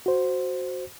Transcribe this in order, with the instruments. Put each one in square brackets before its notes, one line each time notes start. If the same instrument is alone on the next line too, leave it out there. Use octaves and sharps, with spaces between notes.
[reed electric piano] F#4 C5